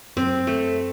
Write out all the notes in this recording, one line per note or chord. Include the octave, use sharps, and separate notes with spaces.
F#2 C4
A3